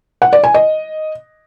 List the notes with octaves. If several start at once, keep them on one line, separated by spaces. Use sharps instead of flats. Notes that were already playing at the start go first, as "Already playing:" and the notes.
F#5
D5
G#5
D#5